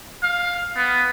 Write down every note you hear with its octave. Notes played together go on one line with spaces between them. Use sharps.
F5
B3